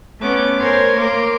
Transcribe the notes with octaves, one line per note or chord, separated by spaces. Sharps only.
A3 B3 C#4 D6
A#4 C5 C#5 G#5 C6
A#3 A#4 C6 D6